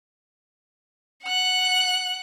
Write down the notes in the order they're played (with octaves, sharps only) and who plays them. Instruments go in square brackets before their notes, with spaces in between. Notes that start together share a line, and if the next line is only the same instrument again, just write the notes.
[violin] F#5 F#6